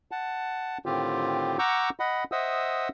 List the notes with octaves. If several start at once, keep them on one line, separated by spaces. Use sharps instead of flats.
F#5 A5
A2 D3 D#3 C4 F4 G4
F#5 A#5 C#6 D6 E6 G6
D#5 F#5 B5
C5 D#5 E5 F#5 D#6 E6